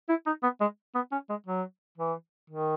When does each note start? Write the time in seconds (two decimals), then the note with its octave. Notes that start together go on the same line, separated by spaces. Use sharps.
0.09 E4
0.27 D#4
0.43 B3
0.61 G#3
0.95 B3
1.12 C#4
1.30 G#3
1.47 F#3
1.98 E3
2.50 D#3